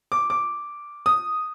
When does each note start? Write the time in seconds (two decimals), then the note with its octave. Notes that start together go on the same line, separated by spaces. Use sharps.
0.12 D6
0.30 D6
1.06 D#6